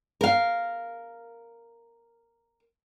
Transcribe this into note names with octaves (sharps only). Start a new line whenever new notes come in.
A#4 F5